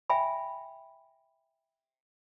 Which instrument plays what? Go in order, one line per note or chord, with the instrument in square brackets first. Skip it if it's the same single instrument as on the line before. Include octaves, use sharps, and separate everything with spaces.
[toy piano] E5 G5 G#5 B5